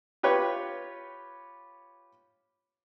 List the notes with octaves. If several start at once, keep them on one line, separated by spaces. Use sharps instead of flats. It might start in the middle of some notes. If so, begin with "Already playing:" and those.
F4 G4 B4 C#5